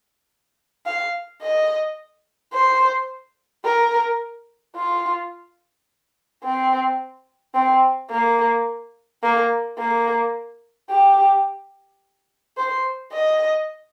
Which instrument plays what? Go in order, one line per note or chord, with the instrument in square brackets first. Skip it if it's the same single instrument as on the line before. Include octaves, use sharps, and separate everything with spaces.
[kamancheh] F5
D#5
C5
A#4
F4
C4
C4
A#3
A#3
A#3
G4
C5
D#5